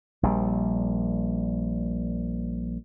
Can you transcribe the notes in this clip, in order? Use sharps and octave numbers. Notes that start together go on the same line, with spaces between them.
A#1 G3